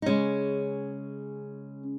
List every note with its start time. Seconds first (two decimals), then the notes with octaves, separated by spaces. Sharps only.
0.02 D#4
0.06 C#3 G#3 C#4